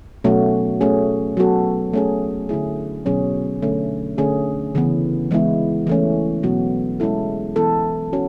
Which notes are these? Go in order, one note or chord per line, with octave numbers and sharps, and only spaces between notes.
B2 F#3 A3 C#4 F#4
A3 C#4 G#4
F#3 B3 F#4 A4
A3 C#4 G#4
D3 A3 E4 G#4
B2 F#3 C#4 G#4
D3 A3 C#4
D3 A3 C#4 G#4
C#3 E3 B3
E3 G#3 B3 E4
E3 A3 C#4
B2 F#3 B3 F#4
G#3 C#4 E4 A4
E3 B3 E4 A4
C#4 F#4